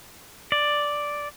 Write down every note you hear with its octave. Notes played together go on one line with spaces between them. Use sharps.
D5